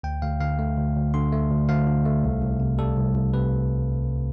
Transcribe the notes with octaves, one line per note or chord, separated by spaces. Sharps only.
D2 G5
D2 F5
D3 F5
A3
D2
D2
D3 C6
A3
D2
D2 F5
D3
A3
C2
C2
C3
G3 A4
C2
C2
C3 B4